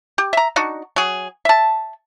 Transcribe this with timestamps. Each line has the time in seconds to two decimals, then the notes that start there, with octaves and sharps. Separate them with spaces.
0.18 G4
0.33 E5 A#5
0.56 D4 D#4 F#4
0.96 F#3 G#4
1.45 E5 A5